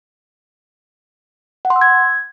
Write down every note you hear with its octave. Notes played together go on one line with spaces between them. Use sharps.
F#5
C6
E6
G#6